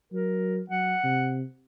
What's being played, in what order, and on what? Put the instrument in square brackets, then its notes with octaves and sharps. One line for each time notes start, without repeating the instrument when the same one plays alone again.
[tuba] F#3 [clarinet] A#4
[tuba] F#3 [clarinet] F#5
[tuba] C3